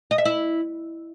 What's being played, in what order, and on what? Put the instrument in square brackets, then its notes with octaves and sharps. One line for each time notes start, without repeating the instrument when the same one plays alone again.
[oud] D#5
E5
E4